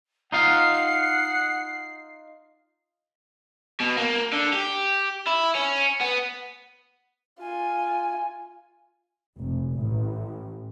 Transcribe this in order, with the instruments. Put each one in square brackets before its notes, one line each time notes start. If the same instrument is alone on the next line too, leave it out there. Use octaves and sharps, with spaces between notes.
[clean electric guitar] D#4 F4 F5 [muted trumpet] F#5 [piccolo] C7
[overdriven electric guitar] B2
A#3
D3
G4
E4
C#4
B3
[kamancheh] F4 G#5
[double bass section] F1
A1